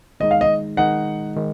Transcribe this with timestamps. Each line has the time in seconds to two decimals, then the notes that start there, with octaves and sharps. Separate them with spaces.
0.20 D#3 G#3 D#4 D#5
0.31 F5
0.41 D#5
0.77 D#3 G#3 D#4 F#5
1.36 D#3 G#3